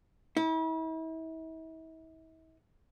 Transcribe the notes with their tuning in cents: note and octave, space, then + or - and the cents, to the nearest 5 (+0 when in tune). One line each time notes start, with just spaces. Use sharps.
E4 -40